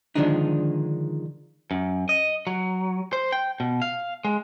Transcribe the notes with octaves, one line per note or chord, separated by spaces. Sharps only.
D3 D#3 F3 G#3 D4 D#4
F#2
D#5
F#3
C5
G5
B2
F5
G#3